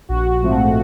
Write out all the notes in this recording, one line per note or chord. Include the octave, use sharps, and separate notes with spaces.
A#1 F#4
G#2 F3 A3 C4